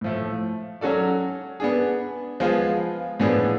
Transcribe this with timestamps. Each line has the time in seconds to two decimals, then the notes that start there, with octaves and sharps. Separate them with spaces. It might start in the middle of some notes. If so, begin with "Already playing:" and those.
0.01 A2 F3 A3
0.81 F#3 C#4 F#4 A4 D5
1.60 B3 D4 G#4
2.40 F3 G#3 B3 F4 G#4
3.20 A2 F3 B3 D4 G#4